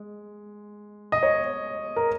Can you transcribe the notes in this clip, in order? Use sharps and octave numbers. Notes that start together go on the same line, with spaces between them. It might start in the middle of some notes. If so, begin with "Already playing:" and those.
Already playing: G#3
D#5
C#5
A#4